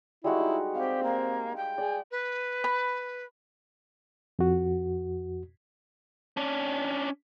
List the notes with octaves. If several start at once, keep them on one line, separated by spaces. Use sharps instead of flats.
G3 G#3 E4 F#4
D#4
C4 G4 F5
A#3
G5
G#4 D5
B4
B5
F2 F#4
C#4 D4